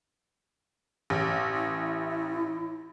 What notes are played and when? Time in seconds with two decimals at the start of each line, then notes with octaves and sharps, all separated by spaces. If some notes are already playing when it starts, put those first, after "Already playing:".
1.10 A1
1.55 E4